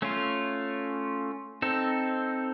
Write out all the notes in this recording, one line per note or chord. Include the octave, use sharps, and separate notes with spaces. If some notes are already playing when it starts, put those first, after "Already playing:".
A3 C#4 F4
C4 D#4 A4